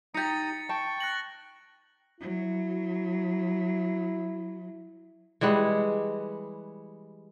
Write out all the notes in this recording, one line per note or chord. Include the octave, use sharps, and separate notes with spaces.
D#4 G4 A#5 D#6 A6 C#7
G5 A5 C#6
F#6 A#6 F#7
F#3 E4
E3 G3 G#3 F#5